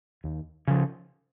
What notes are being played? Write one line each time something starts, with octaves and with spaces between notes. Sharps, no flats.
D#2
C#3 F3